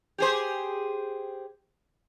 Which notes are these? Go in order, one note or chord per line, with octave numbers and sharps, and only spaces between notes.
G4 G#4 C5